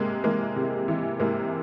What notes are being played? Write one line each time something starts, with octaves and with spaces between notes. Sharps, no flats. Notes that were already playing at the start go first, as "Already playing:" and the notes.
Already playing: C3 G#3 A#3
E3 G#3 A#3
C3
E3
C3 G#3 A#3